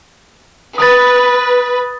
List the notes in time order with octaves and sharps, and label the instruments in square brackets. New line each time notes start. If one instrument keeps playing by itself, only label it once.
[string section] B4 [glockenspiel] D#6 A6